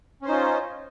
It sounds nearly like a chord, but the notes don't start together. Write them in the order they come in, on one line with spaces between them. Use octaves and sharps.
C#4 C5 D#4 F4